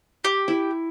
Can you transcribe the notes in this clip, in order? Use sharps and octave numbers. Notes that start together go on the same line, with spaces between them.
G4
E4